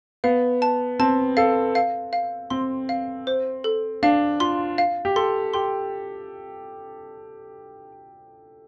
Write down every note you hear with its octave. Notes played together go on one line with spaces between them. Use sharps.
B3 F5
A5
C4 A5
A4 F5
F5
F5
C4 C6
F5
C5
A4
D4 F5
F4 C6
F5
G4
A4 C6
G4 C6